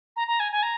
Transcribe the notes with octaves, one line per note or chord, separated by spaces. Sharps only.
A#5
A#5
G#5
G#5
A#5